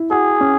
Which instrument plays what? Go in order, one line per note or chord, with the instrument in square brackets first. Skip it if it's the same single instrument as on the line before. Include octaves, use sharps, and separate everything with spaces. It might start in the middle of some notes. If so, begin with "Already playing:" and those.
Already playing: [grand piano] E4
[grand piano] F#4 [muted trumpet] G#4
[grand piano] C#4